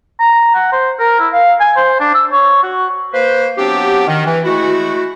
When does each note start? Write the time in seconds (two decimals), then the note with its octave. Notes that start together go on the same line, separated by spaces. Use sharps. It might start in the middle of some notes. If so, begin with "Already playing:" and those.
0.19 A#5
0.55 F#5
0.72 C5
0.99 A#4
1.19 E4
1.32 F5
1.60 G#5
1.77 C5
2.00 D4
2.14 E6
2.32 C#5
2.63 F#4
3.13 A#3 B4 C5
3.58 F#3 B3 C4 D4 G4
4.07 D#3
4.26 E3
4.45 G#3 A3 E4 F#4